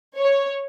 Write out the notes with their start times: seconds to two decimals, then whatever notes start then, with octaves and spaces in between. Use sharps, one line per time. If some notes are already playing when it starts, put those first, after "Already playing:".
0.16 C#5